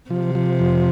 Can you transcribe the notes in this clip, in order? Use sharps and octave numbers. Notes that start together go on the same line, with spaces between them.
C3 F3
F3
F2